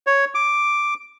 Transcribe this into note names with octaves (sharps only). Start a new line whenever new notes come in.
C#5
D6